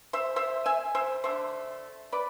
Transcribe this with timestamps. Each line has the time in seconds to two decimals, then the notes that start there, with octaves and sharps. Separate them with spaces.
0.13 C5 E5
0.36 C5 E5
0.66 E5 G#5
0.95 C5 E5
1.24 D3 A3 C5 E5
2.12 B4 D5